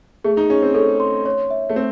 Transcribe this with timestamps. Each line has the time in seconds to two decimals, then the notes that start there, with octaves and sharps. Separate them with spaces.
0.24 A3 G#4
0.37 D#4
0.50 C#4 G#4
0.62 C4
0.74 C#4 A4
1.00 C6
1.26 C#5
1.51 E5
1.69 A3
1.76 C4